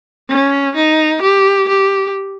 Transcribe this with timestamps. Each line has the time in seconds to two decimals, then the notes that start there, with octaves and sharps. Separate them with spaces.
0.29 C#4
0.75 D#4
1.22 G4
1.68 G4